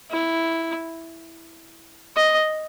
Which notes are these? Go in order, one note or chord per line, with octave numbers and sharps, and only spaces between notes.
E4
D#5